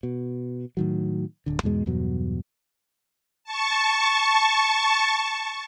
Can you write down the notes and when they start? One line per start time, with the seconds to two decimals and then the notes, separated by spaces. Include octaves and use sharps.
0.03 B2
0.77 A2 D#3 F#3
1.46 D1 D3
1.63 E2 G#2 B2 G#3
1.86 E2 G2 B2 F#3
3.44 A5 C#6